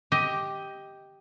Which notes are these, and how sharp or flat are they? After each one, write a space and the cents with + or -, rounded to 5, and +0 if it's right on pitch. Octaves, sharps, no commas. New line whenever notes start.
G4 +0 D#5 +15